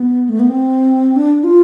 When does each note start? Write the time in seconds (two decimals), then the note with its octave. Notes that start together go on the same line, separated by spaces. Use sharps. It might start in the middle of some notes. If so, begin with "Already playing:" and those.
Already playing: B3
0.29 A3
0.39 B3
0.49 C4
1.16 D4
1.44 F4